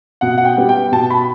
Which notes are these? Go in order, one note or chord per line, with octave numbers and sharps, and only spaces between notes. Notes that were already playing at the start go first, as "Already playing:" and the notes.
B2 F#5
F#5
G5
G3 B3
G5
B2 A5
B5